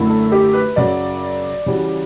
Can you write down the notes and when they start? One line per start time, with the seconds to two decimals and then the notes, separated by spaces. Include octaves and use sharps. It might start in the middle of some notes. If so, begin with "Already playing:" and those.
Already playing: F#2 D3 A3 E4
0.09 A4
0.32 G4
0.53 B4
0.76 F#2 C#3 F#3 D5
1.66 C#3 E3 G3 C#4 F#4